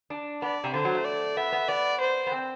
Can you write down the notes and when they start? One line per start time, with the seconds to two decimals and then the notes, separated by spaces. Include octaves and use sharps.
0.10 D4
0.42 B3 D5
0.64 C3
0.74 D3 C5
0.85 F#3
0.95 A3
1.05 D5
1.37 B3 E5
1.52 B3
1.68 B3 D5
2.00 C5
2.27 B3
2.32 C4